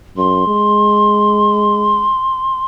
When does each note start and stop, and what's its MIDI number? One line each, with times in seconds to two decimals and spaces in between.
0.17 0.43 42
0.17 2.65 84
0.47 2.11 56